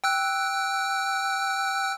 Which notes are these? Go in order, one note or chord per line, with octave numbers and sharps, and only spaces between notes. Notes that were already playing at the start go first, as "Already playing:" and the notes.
G5 E6 F#6